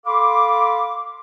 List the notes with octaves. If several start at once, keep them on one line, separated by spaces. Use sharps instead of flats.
A4 F5 B5 C6 D6